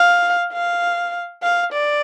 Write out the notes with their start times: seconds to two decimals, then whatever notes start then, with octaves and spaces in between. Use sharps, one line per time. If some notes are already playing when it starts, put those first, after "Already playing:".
Already playing: F5
0.52 F5
1.43 F5
1.73 D5